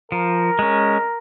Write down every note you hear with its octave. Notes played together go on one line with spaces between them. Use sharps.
F3 A#4
G#3 C#4